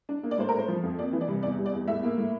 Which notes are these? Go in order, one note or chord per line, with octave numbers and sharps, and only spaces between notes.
D4
A#3
D5
A2 C5
A#4
A3 C5
F3
F2
A#3 D5
E3
D5
C2
E2 D5
G3
D5
E2
A2 E5
A#3
A2